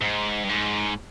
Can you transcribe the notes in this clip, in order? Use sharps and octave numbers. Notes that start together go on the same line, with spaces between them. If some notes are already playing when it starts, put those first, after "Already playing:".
G#2
G2
G#2